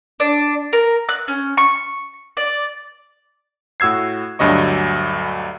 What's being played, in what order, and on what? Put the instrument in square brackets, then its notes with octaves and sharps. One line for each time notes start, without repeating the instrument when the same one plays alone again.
[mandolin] D4
A#4
F#6
C#4
C#6
D5
[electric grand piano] A2 F#4 E6 G#6 C7
D2 G2 F#3 D#5 C#6